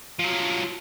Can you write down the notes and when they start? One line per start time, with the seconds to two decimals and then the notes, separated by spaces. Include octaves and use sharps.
0.19 F3 F#3